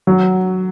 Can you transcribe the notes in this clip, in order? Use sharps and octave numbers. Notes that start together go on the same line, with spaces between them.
F#3